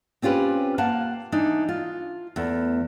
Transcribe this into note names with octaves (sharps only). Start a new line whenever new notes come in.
C4 C#4 F4 G4 B4
A#3 F5 F#5 A5
E3 D4 D#4
F4
E2 A3